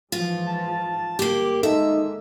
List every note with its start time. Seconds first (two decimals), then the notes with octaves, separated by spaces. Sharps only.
0.12 G#2 E3 F3 F4
0.46 A5
1.19 G1 A#3 G4
1.63 D#3 G#3 A#3 D#4 A4 E5